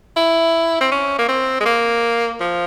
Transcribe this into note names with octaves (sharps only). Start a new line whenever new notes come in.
E4
C4
C#4
A#3
C4
G#3
A#3
F3